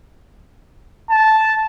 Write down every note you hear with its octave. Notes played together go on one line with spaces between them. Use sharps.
A5